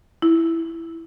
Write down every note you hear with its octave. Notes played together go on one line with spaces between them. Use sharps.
E4